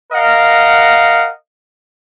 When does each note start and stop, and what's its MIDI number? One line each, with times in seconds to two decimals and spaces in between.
0.12 1.29 70
0.12 1.29 75
0.12 1.29 77
0.12 1.29 78